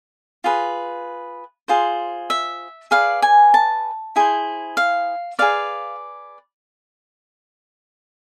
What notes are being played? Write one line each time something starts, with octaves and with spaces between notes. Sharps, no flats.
F4 G#4 B4
F4 G#4 C5
E5
G#4 B4 D5 F5
G#5
A5
E4 G#4 C5
F5
G#4 B4 D5 F5